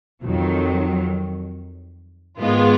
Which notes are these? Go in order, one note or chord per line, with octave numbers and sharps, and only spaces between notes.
F2 D#3 F#3
G#2 D#3 G#3 B3 F4